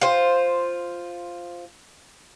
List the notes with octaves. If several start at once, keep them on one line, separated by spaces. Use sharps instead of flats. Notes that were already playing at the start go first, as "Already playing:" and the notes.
F4 C5